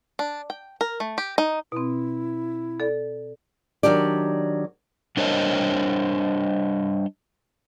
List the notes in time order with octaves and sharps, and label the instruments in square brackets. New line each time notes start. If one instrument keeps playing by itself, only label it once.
[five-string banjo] D4
G5
A#4
A3
G4
D#4
[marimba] B2 C4 [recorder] E4
[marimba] A4 D5
[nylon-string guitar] D#3 F#3 D4 G4 D5
[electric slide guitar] G3 D4 A#4 C5 C#5 D#5